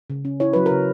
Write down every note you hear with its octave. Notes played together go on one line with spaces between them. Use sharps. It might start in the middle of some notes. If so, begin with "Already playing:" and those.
C#3
C#4
E4 C#5
F#3 B4
C#3 A#4